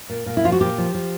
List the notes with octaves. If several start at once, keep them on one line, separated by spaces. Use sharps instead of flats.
A#2
A#2
E4
F3 F4
F#4
A#2 G4
F3
F3